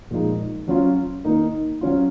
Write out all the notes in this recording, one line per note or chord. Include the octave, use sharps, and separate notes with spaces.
A#2 F3 G#3 D#4
F#3 C#4 F4
D#3 A#3 D#4
F#3 C#4 F4